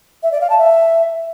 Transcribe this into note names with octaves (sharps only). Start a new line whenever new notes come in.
E5
D5
F5
A5
E5